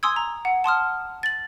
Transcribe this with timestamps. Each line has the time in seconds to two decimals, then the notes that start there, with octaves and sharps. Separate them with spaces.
0.03 G#5 C6 D#6 E6 G#6
0.16 A#5
0.45 F#5
0.64 A5 C6 D#6 F6
1.23 A6 F#7